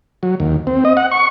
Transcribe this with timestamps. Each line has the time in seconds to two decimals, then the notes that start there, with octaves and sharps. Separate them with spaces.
0.23 F#3
0.40 D#2
0.67 C4
0.85 D#5
0.97 F#5
1.11 C#6